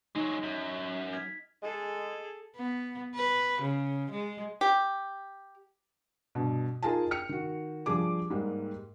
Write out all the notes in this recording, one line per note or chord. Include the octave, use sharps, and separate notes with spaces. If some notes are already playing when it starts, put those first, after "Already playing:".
F#3 G#3 D#4
F#2
F6 G#6 B6
G#3 G#4 A4
B3
B4
C#3
G#3
G4
G2 B2
D#4 F4 G#4 A#4 G#5 A5
G5 F6 C#7
D#3 F#4
F3 G3 D4 G#4 D6
G#2 G3 G#3 A#3